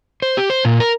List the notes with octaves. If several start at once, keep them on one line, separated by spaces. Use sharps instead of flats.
C5
G4
C5
A#2
A#4